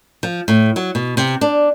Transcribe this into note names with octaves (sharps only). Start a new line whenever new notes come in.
F3
A2
F#3
B2
C3
D4